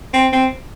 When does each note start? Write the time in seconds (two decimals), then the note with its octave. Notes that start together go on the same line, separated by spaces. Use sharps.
0.14 C4
0.32 C4